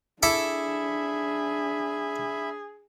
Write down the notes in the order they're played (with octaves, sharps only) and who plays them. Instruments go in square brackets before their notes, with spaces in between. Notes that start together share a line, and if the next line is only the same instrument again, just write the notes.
[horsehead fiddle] D4 [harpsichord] E4 A4 D6 [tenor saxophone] G#4 [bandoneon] E5 B5